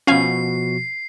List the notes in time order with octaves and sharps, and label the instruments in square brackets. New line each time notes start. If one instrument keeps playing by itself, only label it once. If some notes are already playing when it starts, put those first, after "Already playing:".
[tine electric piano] B2 F3 F#4 [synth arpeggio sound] C#4 F5 G#5 [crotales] C7